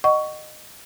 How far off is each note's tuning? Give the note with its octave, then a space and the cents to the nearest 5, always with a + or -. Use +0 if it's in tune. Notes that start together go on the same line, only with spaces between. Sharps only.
D#5 -20 F#5 +25 C#6 +15